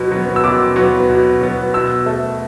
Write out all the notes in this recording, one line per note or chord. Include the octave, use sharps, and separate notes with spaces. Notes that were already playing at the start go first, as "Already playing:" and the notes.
Already playing: B2 F#3 B3
F#3 B3
E6
B2 D6
F#3 B3
B2
F#3 B3
B2 E6
A3